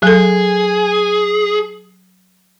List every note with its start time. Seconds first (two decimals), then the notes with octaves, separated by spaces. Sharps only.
0.03 F#3 G#4 A4